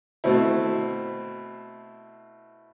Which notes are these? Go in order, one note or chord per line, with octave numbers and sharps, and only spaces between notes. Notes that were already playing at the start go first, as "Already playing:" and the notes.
B2 A3 C4 E4